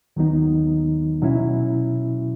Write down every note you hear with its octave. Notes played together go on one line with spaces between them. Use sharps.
D#2 D#3 F#3 B3 D#4
B2 F#3 C#4 E4